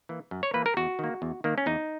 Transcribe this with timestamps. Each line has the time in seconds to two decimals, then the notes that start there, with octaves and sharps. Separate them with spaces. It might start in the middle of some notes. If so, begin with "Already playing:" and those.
0.09 E3 A#3
0.31 F#2
0.43 C#5
0.54 E3 A#3 B4
0.66 A#4
0.77 E2 F#4
0.99 D#3 A#3
1.22 E2
1.44 D#3 A#3
1.58 C#4
1.66 E2 D#4